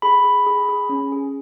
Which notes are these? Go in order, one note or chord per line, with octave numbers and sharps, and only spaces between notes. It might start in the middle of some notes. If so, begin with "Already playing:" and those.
G#4 B5
G#4
G#4
G#4
C#4
G#4